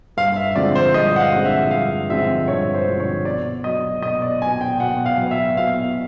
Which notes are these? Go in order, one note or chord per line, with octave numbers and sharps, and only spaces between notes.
G2 F5
E5
D3 F3 G#3 C4 D5
C5
G2 D#5
F#5
F5
D3 F3 G#3 C4
E5
G2 F5
D3 F3 G#3 C4 E5
G2 C#5
C5
D3 F3 G#3 C4
C#5
B2 D5
F#3 B3 D#5
B2 D#5
D5
F#3 B3 G#5
G5
B2 F#5
F5
F#3 B3
E5
B2 F5